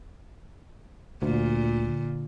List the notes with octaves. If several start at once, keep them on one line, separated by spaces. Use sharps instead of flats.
D2 A#2 D3